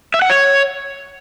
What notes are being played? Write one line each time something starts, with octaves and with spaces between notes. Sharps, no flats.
E5
F#5
C#5